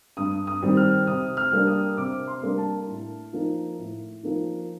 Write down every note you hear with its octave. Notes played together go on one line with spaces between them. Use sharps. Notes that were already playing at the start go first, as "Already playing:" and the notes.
G2 D#6
D#6
D#3 G3 C4
F6
C3 D#6
F6
G3 A#3 D4
D#6
C3 D6
C6
G3 A#3 D4
A5
A2
F3 A#3 D#4
A2
F3 A#3 D#4